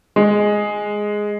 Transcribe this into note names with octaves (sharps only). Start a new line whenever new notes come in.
G#3